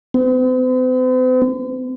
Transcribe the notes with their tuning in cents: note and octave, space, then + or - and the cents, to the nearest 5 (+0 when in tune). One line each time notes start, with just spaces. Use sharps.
C4 -45